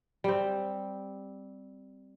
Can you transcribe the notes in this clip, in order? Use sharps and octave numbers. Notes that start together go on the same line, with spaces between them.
G3 C4